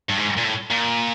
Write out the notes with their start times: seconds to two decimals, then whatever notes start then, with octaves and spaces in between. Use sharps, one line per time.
0.10 G2
0.19 G#2
0.38 A#2
0.44 A2
0.71 A#2